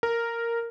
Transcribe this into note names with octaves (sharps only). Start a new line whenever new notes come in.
A#4